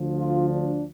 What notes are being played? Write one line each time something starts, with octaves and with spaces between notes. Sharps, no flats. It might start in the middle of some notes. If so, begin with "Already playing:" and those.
Already playing: D2 D3 F3
F4
D4